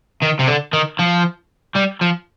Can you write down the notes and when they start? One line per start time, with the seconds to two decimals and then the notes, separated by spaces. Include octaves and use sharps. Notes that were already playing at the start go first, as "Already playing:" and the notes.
0.22 D#3
0.39 C3
0.47 D3
0.73 D#3
0.99 F3
1.76 G3
2.02 F3